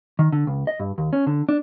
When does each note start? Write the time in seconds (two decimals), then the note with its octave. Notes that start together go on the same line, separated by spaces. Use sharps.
0.19 D#3
0.32 D3
0.47 C#2
0.67 D#5
0.80 G2
0.98 D#2
1.13 C#4
1.27 D3
1.49 D4